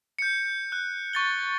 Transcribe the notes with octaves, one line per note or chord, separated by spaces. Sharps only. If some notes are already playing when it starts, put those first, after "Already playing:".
G6 C#7
F#6
C#6 A6 G7